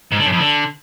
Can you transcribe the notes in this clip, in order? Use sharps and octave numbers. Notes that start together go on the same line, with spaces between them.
G#2
D3
F#2
F2
D3